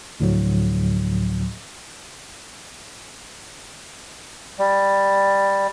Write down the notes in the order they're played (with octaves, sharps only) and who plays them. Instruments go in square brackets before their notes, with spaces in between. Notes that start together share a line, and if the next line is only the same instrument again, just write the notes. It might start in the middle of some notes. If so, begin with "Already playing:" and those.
[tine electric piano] D2 A2 D3 F3 F#3
[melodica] G3